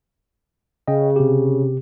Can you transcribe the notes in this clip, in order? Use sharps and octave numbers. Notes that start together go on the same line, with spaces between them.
C#3 D#5 G5
C3 G4